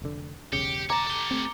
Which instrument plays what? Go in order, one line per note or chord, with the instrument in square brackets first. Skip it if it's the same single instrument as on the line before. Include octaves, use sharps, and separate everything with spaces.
[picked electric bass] F1 D3
[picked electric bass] E1 B1 C#3 [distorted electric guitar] G4 [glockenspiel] C#7
[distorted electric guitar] C#5 A5 [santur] A#5 [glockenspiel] D6
[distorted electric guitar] G4 A4 [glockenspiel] D6 G7
[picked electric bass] A3 C4